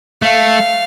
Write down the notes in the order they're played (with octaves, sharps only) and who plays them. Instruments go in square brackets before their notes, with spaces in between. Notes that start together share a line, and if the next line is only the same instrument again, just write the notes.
[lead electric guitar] A3 [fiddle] F5